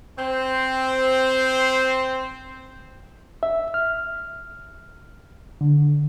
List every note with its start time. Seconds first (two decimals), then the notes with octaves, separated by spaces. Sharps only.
0.18 C4 C5
3.43 E5
3.74 F6
5.61 D3